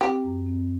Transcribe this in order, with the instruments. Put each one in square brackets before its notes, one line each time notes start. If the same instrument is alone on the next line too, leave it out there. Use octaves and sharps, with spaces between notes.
[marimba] C4 [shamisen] G4
[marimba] F#2
C4